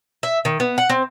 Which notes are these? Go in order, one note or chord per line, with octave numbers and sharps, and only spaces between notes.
E5
D#3
B3
F#5
C4